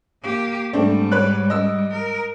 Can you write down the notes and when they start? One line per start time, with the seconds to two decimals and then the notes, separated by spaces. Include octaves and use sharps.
0.23 A#3 G4
0.73 G#2 G3 A3 C4 D4
1.12 B4 C#5 F#6
1.50 D#5 E6
1.93 A#4